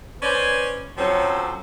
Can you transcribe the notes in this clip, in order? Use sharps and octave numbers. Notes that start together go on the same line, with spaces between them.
C#4 B4 C5 D5 G#5
F3 F#3 C4 C#4 A4